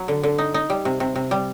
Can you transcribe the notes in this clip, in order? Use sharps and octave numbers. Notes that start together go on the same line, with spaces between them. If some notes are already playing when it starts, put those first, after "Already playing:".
Already playing: F#3
D3
D3
D#4
D#4
G3
C3
C3
C3
G3